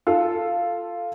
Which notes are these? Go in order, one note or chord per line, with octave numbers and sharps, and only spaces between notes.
F4 A4